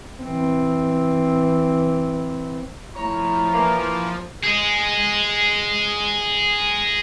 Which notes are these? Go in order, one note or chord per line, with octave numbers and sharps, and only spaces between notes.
E3 C4
F3 A3 E4 C#5 A#5
E3 A#3
G#4 D#5